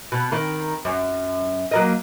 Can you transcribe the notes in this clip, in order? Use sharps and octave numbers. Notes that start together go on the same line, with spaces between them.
B2
D#3
F#2
F#3 A#3 D#5